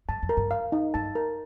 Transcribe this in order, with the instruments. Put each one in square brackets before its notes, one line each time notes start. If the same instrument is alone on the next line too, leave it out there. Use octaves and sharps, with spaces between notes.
[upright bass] G2 [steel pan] A5
[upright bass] F2
[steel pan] A#4
[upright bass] G2
[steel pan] F5
D#4
[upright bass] G2 [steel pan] A5
[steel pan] A#4